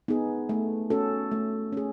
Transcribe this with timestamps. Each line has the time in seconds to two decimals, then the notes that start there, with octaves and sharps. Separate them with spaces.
0.08 B3 D#4 G#4
0.49 A3
0.90 C#4 F#4 A4
1.31 A3
1.72 C#4 G#4